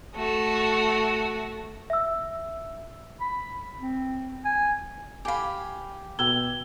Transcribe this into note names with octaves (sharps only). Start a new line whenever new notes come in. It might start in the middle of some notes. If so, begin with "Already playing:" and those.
A3 F#4
E5 E6
B5
C4
G#5
G4 F5 G#5 B5
B2 G5 E6 G#6 G7